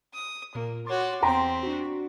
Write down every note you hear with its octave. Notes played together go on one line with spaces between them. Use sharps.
D#6
A#2 A#3
F#4 C#5 C6 D6 A6
E2 C4 G5 A#5 C6 B6 D7
D4 F#4